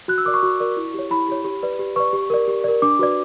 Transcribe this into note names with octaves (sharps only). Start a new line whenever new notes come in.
F#4 F#6
E6
A#4 D5 D6
C#6
F#4
A#4 D5
E4
G4 C#5
E4 B5
G4 C#5
G4
B4 D5
G4
B4 D5 C#6
G4
A#4 D5
G4
A#4 D5
D4 D6
F#4 B4 D5